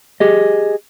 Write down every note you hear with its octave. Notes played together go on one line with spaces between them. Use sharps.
G4 G#4 D#5